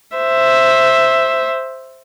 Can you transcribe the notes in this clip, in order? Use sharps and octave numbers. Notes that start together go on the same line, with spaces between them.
C5 E5